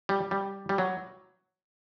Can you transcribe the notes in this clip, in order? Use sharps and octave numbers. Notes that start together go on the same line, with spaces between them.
G3
G3
G3
F#3